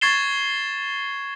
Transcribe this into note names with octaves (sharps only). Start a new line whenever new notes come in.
C#6 G#6 A6 C7 E7 G7